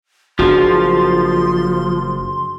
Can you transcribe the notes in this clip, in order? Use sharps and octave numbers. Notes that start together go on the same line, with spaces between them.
F#1 F3 D4 F#4 G#4 C6